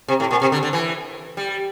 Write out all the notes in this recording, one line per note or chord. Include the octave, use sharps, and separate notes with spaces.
C3
A2
A#2
C3
D3
D3
E3
G3